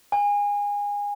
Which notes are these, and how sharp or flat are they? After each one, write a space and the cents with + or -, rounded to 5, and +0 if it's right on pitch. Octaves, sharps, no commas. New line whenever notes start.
G#5 -25